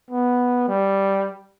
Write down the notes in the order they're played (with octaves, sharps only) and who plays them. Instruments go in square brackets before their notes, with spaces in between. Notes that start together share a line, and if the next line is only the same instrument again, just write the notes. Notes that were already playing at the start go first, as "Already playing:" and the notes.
[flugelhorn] B3
G3